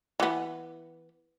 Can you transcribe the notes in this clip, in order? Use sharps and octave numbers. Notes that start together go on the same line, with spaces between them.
E3 B3